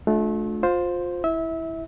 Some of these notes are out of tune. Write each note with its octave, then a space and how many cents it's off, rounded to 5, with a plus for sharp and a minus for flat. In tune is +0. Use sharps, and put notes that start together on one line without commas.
A3 -30 D4 +0 F4 +35
F4 +25 C5 +0
E4 -5 E5 -25